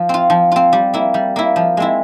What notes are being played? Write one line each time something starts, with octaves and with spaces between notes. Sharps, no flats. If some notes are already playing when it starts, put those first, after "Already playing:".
Already playing: F3
C4 F4
F3
C4 F4
G3
A#3 E4
G3
A#3 E4
F3
G#3 C4 E4